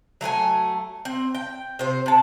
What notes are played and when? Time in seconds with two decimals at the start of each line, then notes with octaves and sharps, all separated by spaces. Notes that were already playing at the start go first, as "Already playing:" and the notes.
0.21 F#3 A3 B4 G#5
1.05 C4
1.35 G5
1.79 C3 C5
2.06 C3 A5